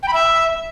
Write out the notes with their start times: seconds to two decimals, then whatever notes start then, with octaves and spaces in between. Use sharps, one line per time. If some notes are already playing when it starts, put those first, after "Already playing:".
0.03 G5
0.08 B5
0.13 E5